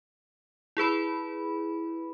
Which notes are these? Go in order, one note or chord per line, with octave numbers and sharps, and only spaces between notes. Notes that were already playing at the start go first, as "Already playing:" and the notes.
E4 G#4 B4 B5